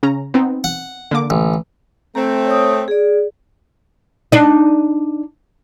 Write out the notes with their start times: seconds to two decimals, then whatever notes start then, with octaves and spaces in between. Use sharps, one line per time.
0.03 C#3 C#4 A#5
0.34 B3 C4 D#4
0.64 F#5
1.11 D3 A#3 D6
1.30 A1
2.15 A3 C4 A#5
2.46 C#5 D#6
2.88 G#4 D5
4.32 D4 D#4